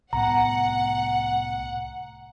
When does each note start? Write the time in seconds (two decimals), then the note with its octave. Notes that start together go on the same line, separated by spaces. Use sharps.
0.13 C2 A2 B3 F#5 A#5